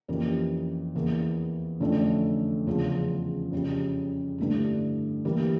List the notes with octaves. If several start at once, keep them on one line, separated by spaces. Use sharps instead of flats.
F2 E3 A#3 C#4 G4
E2 E3 A#3
F2 D3 A3 C#4
E2 C#3 F3 C#4 F4
F2 C#3 G3 C#4 G4
G2 D3 A3 E4
E3 G3 A#3